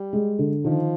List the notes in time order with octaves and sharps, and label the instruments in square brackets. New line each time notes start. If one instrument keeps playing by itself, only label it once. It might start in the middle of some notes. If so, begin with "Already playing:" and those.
Already playing: [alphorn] G3
[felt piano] G#3
D3
[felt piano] D#3 [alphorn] F3